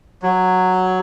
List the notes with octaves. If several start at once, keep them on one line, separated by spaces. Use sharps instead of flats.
F#3